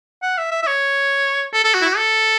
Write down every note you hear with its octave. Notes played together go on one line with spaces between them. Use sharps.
F#5
E5
E5
E5
C#5
A4
A4
F#4
E4
F#4
A4